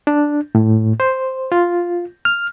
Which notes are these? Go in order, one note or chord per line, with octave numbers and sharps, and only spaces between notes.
D4
A2
C5
F4
F6